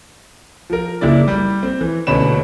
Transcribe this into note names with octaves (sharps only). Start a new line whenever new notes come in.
F3 A#4
F#1 A#3 E4 D5
G3
C4
E3
D#1 D2 B2 C#4 B5 E7